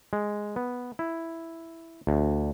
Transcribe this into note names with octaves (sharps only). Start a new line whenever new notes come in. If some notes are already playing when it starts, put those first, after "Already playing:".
G#3
B3
E4
D2